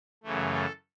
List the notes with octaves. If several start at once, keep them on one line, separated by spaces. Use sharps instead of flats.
F#2 C#3 E3 A3
A4